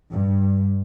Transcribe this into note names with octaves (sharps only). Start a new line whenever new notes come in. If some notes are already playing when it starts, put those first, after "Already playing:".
G2